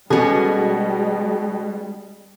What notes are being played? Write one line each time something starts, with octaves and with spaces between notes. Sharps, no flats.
B2 G3 G#3 B3 C#4 G#4 A4